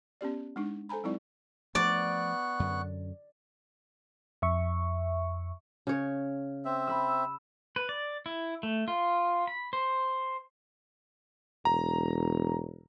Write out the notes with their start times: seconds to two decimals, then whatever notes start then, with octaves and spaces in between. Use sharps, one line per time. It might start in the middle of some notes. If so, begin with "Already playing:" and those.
0.21 B3 C#4 G4 D5
0.56 G#3 D4 D#4
0.89 A4 C5 G#5 A#5 B5
1.04 F#3 G#3 C4 D#4 E4 D5
1.75 F3 A3 B3 D5 C#6 F#6
2.60 F#2 D3
4.42 F2 E5 C#6
5.87 C#3 C#5
6.65 C4 E5
6.87 B5 E6
7.76 B4
7.89 D5
8.26 E4
8.63 A3
8.88 F4
9.47 B5
9.73 C5
11.65 E1 A#5